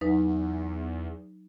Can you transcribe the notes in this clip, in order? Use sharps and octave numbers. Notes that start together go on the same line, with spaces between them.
E2 F#3 D#4 B4